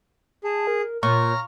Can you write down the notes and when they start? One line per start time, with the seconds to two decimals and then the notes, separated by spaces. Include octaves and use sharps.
0.44 G#4 A5
0.67 A#4
1.03 A#2 C#5 A#5 C#6 F6